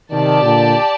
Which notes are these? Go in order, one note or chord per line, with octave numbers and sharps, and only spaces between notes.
C3 D#3 G4 D5 A5
A#2 D3